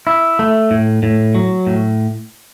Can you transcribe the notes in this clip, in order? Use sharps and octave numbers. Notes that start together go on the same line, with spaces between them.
E4
A3
A2
A2
F#3
A2